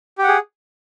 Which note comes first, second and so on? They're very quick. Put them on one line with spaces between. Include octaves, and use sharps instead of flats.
G4 F#5 G#4